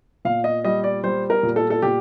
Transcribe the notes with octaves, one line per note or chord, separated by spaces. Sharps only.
A#2 F5
D#5
G3 D#5
D5
G3 C5
A#4
A#2
A4
A4
A#2 G4